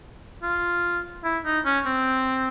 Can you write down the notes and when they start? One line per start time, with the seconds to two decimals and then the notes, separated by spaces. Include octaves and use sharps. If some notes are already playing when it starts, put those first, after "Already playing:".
0.43 F4
1.24 E4
1.45 D#4
1.65 C#4
1.86 C4